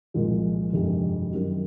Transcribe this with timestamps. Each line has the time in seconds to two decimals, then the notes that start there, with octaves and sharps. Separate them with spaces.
0.14 C2 A#2 F3 G#3
0.73 G1 F2 C3 D#3 G#3
1.31 F#2 D#3 G3